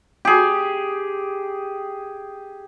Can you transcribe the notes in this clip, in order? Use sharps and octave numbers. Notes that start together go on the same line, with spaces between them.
G4 G#4